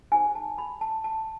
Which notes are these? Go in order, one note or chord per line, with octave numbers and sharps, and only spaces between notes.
D#4 G#4 C5 G#5
A5
B5
A5
A5